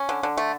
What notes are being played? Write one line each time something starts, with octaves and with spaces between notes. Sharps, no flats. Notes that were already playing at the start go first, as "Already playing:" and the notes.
Already playing: C#4
D3
D3
A3